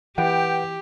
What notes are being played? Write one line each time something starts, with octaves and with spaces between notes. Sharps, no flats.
E3 G4 B4 F#5 G5